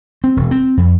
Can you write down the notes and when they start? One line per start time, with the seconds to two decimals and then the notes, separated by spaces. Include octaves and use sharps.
0.24 C4
0.37 E1
0.51 C4
0.77 F2